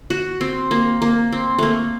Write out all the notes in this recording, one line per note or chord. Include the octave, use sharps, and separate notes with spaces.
F#4
C4
A#3
A#3
C4
A3 A#3